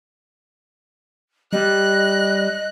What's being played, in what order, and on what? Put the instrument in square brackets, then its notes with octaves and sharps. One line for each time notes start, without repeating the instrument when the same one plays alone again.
[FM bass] G3 [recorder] D#5 [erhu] F#6